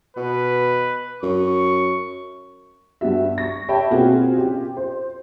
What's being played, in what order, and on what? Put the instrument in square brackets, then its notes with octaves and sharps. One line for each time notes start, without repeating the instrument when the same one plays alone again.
[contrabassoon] B2 [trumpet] B4
[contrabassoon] F#2 [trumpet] C#6
[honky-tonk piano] G2 G3 B3 F#4 E5
C#6 A#6
G4 C#5 E5 G5 A5 B5
B2 A#3 C4 F4 F#4 G#4
C#4 F4 G4
C5